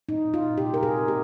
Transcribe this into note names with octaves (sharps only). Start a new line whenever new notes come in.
A#2 D#4
A#2 F4
C3 G4
A#4
C3 G#4
A#2 G4